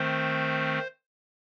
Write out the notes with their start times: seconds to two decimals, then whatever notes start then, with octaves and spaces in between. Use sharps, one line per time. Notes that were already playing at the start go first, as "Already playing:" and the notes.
Already playing: D#3 A3 C4 C5